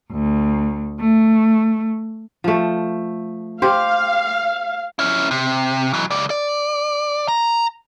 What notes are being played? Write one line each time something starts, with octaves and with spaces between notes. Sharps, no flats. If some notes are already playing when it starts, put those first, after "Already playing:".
D2
A3
F3 A3
G4 C5 F5
C#4 E4
C3
E3 F#3
C#2 D5
D5
A#5